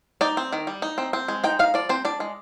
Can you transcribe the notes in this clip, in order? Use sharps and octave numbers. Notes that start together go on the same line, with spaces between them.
D#4 D5
C4
D#3
G3
D#4
C4
C4
G#3
D#4 G5
D#4 F5
F3 D5
C4 C5
D4 D5
G#3